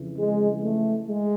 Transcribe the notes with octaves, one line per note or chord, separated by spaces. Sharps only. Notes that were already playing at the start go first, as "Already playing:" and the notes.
Already playing: F2 C#3 E3
G#3
A3
G#3